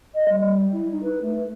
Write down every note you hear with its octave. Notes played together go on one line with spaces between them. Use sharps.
D#5
G3
E4
D#4
B4
A3